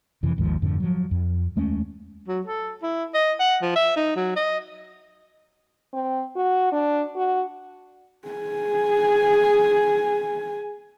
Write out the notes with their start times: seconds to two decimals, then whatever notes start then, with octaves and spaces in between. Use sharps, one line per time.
0.23 F2 C3 E3
0.37 G#1 D#2 G#2 F3
0.62 F2 G#2 D3 F3
0.80 F3 F#3
1.11 F2
1.56 D#2 G#3 A3 C#4
2.28 F#3
2.47 A4
2.82 E4
3.14 D#5
3.40 F#5
3.62 F3
3.76 E5
3.96 D#4
4.16 F#3
4.36 D#5
5.93 C4
6.36 F#4
6.72 D4
7.16 F#4
8.28 G#4 G#5